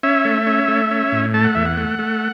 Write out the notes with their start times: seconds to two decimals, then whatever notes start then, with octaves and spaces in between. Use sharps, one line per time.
0.03 C#4 E5
0.25 A3
0.47 C#4
0.68 A3
0.91 C#4
1.12 A2
1.34 A3 A5
1.44 F#5
1.55 E2 E5
1.66 F#5
1.77 A3
1.99 A3